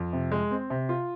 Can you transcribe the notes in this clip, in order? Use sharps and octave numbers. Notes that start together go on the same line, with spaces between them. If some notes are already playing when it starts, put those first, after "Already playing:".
Already playing: F2
C3
G#3
C4
C3
F4